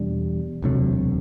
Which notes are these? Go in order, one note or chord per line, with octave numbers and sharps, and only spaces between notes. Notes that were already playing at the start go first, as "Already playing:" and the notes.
Already playing: E2 B2 G3 D4
E1 D2 C3 F#3